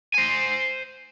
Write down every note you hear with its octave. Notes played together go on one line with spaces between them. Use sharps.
C5 G#5